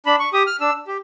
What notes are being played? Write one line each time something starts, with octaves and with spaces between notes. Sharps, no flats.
D4 B5
C#6
G4 D#6
F6
D4 E6
G4